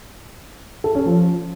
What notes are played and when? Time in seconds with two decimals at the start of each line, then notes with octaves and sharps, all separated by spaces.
0.84 A4
0.95 C#4
1.06 F3